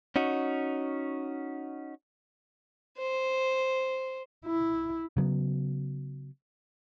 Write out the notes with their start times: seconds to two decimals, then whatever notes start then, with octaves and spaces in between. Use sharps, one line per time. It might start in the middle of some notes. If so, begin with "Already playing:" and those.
0.16 C#4 D#4 F#4
2.98 C5
4.46 E4
5.17 C#3 F#3 B3